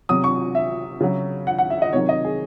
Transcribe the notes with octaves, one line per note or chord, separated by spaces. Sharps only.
C3 F#3 D#6
C#6
E5
C#3 F#3
F#5
F#5
E5
D#5
C3 D#3 F#3 C#5
D#5
G#4